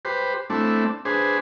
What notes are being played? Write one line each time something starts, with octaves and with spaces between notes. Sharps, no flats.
G4 B4 C5
A3 C4 D4 E4
D4 G#4 B4 C5